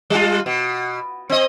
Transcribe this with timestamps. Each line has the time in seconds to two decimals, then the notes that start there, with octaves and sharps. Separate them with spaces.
0.10 G3 F4
0.46 B2
1.30 C4 D#5